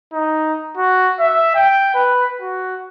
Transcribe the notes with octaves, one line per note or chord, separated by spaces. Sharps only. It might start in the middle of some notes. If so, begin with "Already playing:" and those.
D#4
F#4
E5
G5
B4
F#4